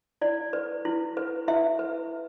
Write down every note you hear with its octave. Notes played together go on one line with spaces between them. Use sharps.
E4 D5
B4
E4
B4
E4 E5
B4